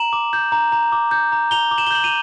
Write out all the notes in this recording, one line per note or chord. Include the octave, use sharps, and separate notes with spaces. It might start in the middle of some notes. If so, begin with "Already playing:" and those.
Already playing: A#5 E7 F#7
D6
G6
A#5
A#5
D6
G6
A#5
A#5 F7 G7
D6
E7 F#7
G7
G6 F#7
D#7 F7